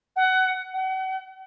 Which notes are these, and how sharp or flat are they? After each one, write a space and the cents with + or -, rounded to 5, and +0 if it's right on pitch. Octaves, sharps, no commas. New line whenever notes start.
F#5 +20
F#5 +35